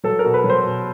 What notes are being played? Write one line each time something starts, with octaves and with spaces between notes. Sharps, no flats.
F#3 A4
A#4
B2
B4
F#3
C5
B2